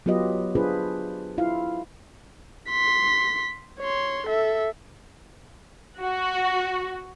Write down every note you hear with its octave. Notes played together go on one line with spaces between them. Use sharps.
F#3 B3 F4 G4 B4 D#5
D4 F4 G#4 B4 C5
E4 F4 F5
C6 B6
C#5 C6
A4 E5
F#4